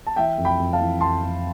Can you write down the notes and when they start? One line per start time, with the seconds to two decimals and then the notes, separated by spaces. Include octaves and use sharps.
0.07 A5
0.16 E3 E5 G5
0.38 F2
0.45 G5 B5
0.60 F2
0.73 F5 A5
0.80 E3
1.01 F2 A5 C6
1.23 F2